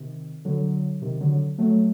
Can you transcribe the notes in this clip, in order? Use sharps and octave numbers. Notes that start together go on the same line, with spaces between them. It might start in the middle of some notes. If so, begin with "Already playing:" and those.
Already playing: C3 D#3
D3 F#3
C3 D#3
D3 F#3
F#3 A3